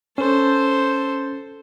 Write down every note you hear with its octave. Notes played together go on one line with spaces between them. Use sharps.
C#4 A4 C5